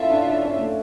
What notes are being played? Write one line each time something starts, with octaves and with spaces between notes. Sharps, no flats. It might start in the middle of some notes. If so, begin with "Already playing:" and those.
Already playing: C#4 E4 F4 A4 E5
D4
D4
C#4
A3